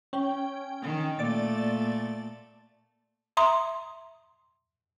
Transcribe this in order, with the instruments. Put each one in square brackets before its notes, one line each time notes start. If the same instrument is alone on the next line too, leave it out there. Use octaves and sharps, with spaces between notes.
[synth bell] C#4 G5
[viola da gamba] D#3
[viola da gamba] A#2 A3 [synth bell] D5 A6
[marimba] E5 A#5 C6 D#6